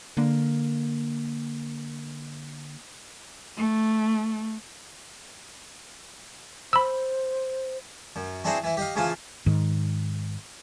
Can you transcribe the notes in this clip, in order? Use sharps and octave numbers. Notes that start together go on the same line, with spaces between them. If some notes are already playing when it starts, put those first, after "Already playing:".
D3 A#3
A3
C5 B5 E6
F#2
C4 D4 E4 F#4 G#4 C5
E3 E4
G4 D#5 F5
C#3 E3 F3 F4 C5
G#2 D#3